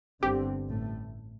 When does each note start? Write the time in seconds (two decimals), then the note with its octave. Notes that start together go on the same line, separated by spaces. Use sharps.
0.22 G1 G2 D3 C4 G4
0.70 A1 A2 A3